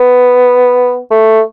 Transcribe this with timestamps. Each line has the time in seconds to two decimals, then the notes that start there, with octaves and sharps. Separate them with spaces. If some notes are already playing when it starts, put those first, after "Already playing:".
Already playing: B3
1.11 A3